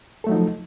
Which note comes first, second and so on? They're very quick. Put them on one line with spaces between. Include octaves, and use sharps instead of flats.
A4 A3 F#3 D#4 F3